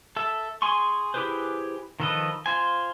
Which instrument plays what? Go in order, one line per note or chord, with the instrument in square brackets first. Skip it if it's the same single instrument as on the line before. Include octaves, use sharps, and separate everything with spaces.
[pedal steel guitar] A4 E5
G#4 G#5 C6 C#6
E4 G4 G#4 B4 C5
D#3 F3 A4 B4 D#5
F4 C5 G#5